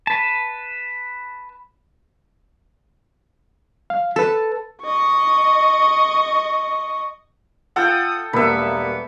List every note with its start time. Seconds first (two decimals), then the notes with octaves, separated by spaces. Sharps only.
0.07 B4 A5
3.90 F5
4.16 A4 B4 A5
4.83 D#5 C#6
7.76 F4 A4 F#5 G5 D#6
8.33 E1 G3 A#3 B3 E5 B5